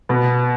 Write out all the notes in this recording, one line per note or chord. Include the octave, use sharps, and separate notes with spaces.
B2 B3